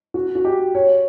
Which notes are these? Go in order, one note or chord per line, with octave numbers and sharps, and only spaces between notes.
F#4
F#4
G4
C#5